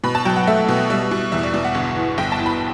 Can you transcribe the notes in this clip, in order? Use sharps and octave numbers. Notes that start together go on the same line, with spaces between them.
B2 B5
A5
F#3 G5
F#5
A3 E5
B2
G3 E5
B2
E2 E5
D5
B2 D5
F#5
G1
E3
G1 G5
A5
E3
B5